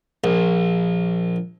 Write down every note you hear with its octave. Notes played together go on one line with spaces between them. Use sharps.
A#1